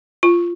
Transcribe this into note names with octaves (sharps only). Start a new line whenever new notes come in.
F4